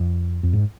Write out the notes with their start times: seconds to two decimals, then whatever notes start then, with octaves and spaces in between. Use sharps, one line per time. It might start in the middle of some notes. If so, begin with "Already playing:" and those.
Already playing: F2
0.43 F2
0.53 G#2